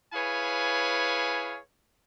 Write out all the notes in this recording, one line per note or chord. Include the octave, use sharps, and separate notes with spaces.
E4 G#4 B4 C#5 F5 G#5